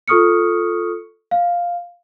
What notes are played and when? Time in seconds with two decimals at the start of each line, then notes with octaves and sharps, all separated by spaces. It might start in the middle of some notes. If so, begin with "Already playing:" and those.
0.08 F4 A4 C#6 D#6 F6 C#7
1.31 F5